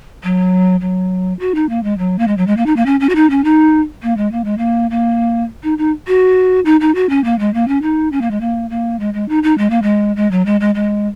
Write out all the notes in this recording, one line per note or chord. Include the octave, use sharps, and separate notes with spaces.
F#3
F#3
F#4
D#4
A#3
G#3
F#3
A#3
G#3
F#3
G#3
A#3
D#4
A#3
C#4
C#4
F#4
D#4
C#4
D#4
A#3
G#3
A#3
G#3
A#3
A#3
D#4
D#4
F#4
D#4
D#4
F#4
C#4
A#3
G#3
A#3
C#4
D#4
C#4
A#3
G#3
A#3
A#3
G#3
G#3
D#4
D#4
G#3
A#3
G#3
G#3
F#3
G#3
G#3
G#3